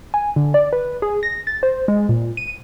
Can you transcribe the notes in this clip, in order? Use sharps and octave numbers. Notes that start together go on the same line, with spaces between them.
G#5
D3
D5
B4
G#4
A#6
A6
C5
G#3
A#2
D#7